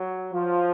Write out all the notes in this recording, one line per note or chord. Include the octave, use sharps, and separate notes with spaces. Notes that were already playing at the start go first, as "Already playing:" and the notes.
Already playing: F#3
F3